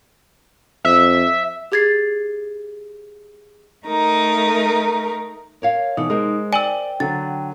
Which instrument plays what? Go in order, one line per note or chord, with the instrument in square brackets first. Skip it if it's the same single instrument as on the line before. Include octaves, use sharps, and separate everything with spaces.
[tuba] F2 [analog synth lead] E5
[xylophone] G4 G#4 G#6 A6 C7
[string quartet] A3 D#4 A#4
[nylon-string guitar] A#4 C#5 F5
[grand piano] B2 [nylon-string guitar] E3 A4 [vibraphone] D#4
[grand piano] G#3 [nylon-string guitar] A#4 C5
[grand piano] D5 D#7 F#7 [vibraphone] G5 [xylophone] G#5 E6
[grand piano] D3 F#3 [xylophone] A6